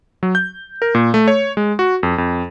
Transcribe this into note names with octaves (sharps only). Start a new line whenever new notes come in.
F#3
G6
A#4
A#2
A3
C#5
G#3
F#4
F2
F2